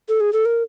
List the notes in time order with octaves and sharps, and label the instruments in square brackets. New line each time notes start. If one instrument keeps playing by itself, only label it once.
[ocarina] A4
G#4
A4
A#4